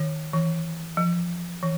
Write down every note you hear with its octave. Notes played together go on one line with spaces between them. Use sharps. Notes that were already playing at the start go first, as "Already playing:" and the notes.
Already playing: D#3
E3
F3
E3